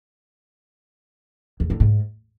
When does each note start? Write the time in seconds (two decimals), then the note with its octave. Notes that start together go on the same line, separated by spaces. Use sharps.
1.60 E2
1.70 D3
1.80 G#2